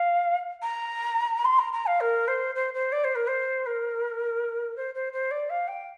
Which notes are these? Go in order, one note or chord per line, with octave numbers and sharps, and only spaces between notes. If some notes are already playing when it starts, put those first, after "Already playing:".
Already playing: F5
A#5
C6
A#5
A#5
F5
A#4
C5
C5
C5
D5
C5
A#4
C5
A#4
C5
C5
C5
D5
F5
G5